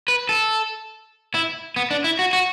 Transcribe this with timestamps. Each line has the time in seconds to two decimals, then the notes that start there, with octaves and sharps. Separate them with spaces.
0.08 B4
0.29 A4
1.34 E4
1.76 B3
1.91 D4
2.04 E4
2.19 F#4
2.33 F#4